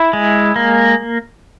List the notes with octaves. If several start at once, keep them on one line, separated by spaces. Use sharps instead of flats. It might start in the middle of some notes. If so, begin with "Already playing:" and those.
Already playing: E4
G#3
A#3